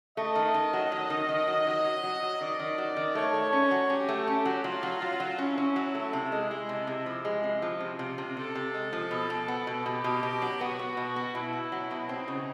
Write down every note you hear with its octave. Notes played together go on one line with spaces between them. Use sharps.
A3 D#5
D#3
D#3
F#3
F#3 D#5
D#3
D#3
F#3
F#3 D#5
F#3
F#3
F#3
D#3 D5
D#3
F#3
D#3
A3 C#5
A3
C#4
F#3
C#4 G4
A3
C#4
F#3
F#3 F4
F#3
F#3
F#3
C#4 E4
C#4
F#3
A3
C3
G#3
G#3
C3
C3
F3
G#3
C3
F3 F4
C3
C3
C3
C3 A4
C3
G#3
F3
B2
B2
B3
B2
B2 G4
B2
B2
F#3
B3 F#4
B3
B2
B3
B2 E4
B3
F#3
B2
C4 D#4
C#3